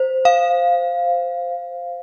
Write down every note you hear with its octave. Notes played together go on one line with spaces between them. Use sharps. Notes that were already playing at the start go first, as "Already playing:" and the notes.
Already playing: C5
F5